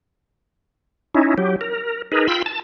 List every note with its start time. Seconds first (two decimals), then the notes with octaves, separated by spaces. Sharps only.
1.14 C#4 D#4 E4
1.38 F#3 G4
1.61 A#4
2.12 D#4 G#4 A#4 B4
2.28 F4 G5 B5 E6
2.46 A5